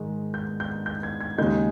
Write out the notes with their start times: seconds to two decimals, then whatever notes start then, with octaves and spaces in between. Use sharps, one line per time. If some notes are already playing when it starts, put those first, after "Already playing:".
Already playing: G#2 D#3 G#3 D#4
0.34 G6
0.60 G6
0.86 G6
1.03 G#6
1.20 G#6
1.38 D#2 C#3 G#3 D#4 G6